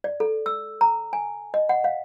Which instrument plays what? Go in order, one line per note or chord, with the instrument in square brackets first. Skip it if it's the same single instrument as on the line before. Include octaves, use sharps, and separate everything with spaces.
[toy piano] D5
A4
E6
A#5
G#5
D#5
F#5
F5